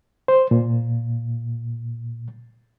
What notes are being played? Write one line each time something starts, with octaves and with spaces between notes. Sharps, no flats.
C5
A#2